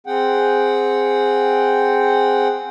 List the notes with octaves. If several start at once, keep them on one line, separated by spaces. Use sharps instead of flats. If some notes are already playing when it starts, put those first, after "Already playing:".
C4 G#4 F#5 G5